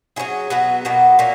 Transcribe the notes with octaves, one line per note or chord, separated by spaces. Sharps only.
F#3 C#4 E4 G#4
B2 F#3 B3 F#4
B2 F#3 A#3
A#2 A#3 C#4